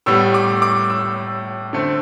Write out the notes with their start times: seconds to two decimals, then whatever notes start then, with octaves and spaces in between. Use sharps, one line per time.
0.06 A2 G3 B3 E6
0.34 D6
0.62 D6
0.90 E6
1.73 D3 A3 C4